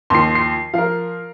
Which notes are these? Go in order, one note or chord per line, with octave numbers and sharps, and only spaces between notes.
D#2 F3 C6 C7
C7
F3 A#4 F5